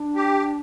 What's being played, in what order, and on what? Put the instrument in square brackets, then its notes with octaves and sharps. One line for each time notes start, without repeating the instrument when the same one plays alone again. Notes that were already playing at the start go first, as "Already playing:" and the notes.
Already playing: [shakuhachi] D4
[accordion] G4